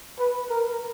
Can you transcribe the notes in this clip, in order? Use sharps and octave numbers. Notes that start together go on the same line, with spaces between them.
B4
A#4